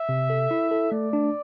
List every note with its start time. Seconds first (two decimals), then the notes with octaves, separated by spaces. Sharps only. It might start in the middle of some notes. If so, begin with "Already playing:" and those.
Already playing: E5
0.09 C3
0.30 A4
0.51 E4
0.71 A4
0.92 A3 D5
1.13 D4